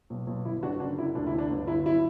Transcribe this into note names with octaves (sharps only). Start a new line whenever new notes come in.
B1
B1
G1 E4
G1 D4 F#4
F#1 D4 F#4
F#1 E4
D2 D4
E4
D2
D4
G1
G1 E4
F#3 E4